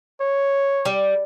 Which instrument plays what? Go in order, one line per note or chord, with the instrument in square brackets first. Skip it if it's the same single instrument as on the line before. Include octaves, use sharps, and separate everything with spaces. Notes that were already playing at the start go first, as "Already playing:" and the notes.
[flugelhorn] C#5
[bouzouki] G3